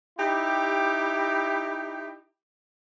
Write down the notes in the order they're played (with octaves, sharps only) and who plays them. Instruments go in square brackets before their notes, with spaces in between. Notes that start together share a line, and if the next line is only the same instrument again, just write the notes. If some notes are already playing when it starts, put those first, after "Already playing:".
[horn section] D#4 E4 G4